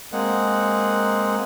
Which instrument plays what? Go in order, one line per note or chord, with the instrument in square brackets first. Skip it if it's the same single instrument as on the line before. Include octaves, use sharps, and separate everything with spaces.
[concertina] G#3 A#3 C4 G#4 F#5